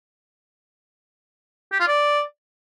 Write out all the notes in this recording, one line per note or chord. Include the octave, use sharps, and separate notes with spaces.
G4
F4
D5